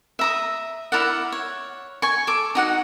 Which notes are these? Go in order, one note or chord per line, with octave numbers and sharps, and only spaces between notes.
E5 A#5 D#6
E4 A#4 D5 F#5
C#5
G#5 C#6
A4 D6
D#4 F#4 F#5